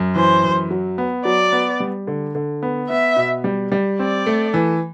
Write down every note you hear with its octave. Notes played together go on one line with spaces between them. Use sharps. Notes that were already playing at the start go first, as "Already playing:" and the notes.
Already playing: F#2
E3 C5
F#2
F#3
B3
F#3 D5
B3
G3
D3
D3
B3
B3 E5
B2
G3
G3
C4 D5
A3
E3